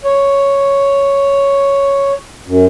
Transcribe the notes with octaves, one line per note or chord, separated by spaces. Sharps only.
C#5
F#2